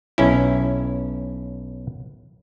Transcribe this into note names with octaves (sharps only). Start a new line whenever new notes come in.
B1 C#4 E4